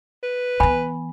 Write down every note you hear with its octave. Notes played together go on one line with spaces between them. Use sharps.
B4
E3 B3 G#5 B5